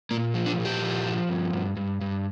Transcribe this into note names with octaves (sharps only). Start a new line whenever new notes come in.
A#2 A#3
F3
D4
A#2
G4
F3
F3
G2
G2
G2
G2